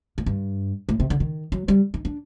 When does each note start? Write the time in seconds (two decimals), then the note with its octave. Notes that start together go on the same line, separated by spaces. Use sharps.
0.18 A2
0.26 G2
0.89 A2
1.00 C3
1.10 D3
1.20 D#3
1.52 F#3
1.68 G3
1.94 D#4
2.05 D4